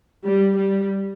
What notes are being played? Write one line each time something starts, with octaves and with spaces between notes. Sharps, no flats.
G3
G3